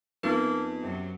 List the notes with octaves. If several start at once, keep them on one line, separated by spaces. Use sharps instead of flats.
F2 A#3 B3 D#4 B4
F#2 C3 F#3